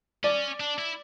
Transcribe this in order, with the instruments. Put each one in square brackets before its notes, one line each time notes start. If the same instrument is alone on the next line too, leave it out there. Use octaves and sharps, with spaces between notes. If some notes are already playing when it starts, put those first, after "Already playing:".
[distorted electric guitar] C#4 [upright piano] D5
[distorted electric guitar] D4
E4